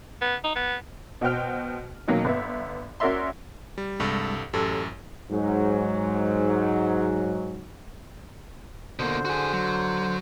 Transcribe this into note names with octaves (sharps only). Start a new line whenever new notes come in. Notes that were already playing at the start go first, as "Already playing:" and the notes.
B3
D#4
B3
B2 F#4 C5 G5 F6
B2 D#3 F#3 A#3
G1 B3 E5
C#4 F#4 A#4 D5 E5 C6
G3
C2 G2 G3 G#3 A4
A1 F#2 G4 A4 E6
G#2 F#3
B2 D3 A#3 C5
F#4 G#4
F#3